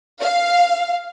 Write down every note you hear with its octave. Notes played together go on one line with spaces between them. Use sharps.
F5